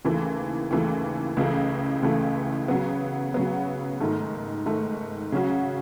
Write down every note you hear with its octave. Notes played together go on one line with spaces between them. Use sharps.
D#2 C#3 E3 A3
D#2 C#3 E3 A3
C#2 C#3 E3 A3
C#2 C#3 E3 A3
C#3 F#3 B3
C#3 F#3 B3
G#2 D#3 A3
G#2 D#3 A3
C#3 F#3 C#4 F#4